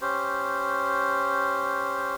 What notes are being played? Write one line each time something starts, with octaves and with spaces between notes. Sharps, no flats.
C#4 G4 C5